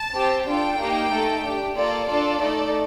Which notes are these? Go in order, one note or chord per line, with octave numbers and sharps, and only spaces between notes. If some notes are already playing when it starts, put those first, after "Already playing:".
Already playing: A5
C4 G4
D4 F4 A4 G5
A#3 D#4 G4
A3 D#4 A4
D4 G4
A#3 F4 A4 D5
D4 F4 A4 D5
A3 D#4 A4